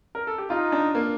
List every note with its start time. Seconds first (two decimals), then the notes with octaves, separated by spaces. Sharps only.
0.15 A#4
0.27 A4
0.38 G4
0.50 D#4 F4
0.72 D4
0.95 A#3